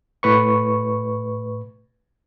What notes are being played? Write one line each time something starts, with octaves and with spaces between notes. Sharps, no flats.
A2 B4 C#6